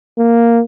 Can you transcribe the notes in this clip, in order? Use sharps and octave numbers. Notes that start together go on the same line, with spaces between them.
A#3